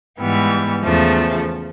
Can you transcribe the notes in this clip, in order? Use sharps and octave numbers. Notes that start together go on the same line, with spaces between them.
G#2 E3 G3 B3
E2 C#3 F3 A3